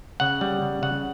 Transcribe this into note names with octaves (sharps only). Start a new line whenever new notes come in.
C#3 F#5
G3
C#3
C#3 F#5